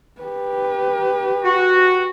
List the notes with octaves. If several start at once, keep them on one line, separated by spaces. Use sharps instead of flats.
G4 B4
F#4